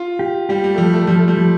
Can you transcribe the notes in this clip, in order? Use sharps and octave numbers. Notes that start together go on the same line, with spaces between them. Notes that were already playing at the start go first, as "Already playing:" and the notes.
Already playing: F4
G4
G3 G4
G3
A3
F3 G3
A3
F3 G3
A3
G3
F3